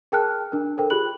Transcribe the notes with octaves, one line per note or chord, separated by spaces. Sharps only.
G#4 A#4 G5 A5 F6 F#6
D4 A#4
A4 A#4 C5 G5
F4 G4 G#4 B5 F#6 F#7